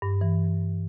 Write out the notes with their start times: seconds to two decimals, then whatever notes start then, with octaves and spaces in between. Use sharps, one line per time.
0.02 G2
0.21 E3